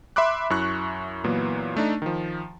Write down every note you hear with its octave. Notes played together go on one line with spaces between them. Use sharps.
E5 B5 C6 D6 F#6
F#2 E4 C#6 F#6
A#2 E3 F#3 A#3 B3
A3 D4 D#4
D#3 F3